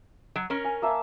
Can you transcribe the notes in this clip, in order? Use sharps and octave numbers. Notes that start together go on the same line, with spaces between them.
F#3
C#4 A#4
G#5
A#3 E5 A5